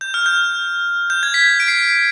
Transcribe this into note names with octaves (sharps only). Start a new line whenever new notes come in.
G6
F6
G6
G6
G#6
B6
D7
C7